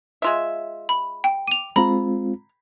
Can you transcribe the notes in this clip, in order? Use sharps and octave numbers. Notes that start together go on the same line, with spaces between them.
G#3 F4 E5
B5
G5
D6 D#7 F7
G#3 C4 F4 A#5 B5